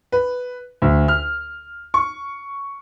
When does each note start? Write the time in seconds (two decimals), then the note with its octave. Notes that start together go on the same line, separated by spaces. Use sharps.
0.12 B4
0.82 D2
1.08 F6
1.94 C#6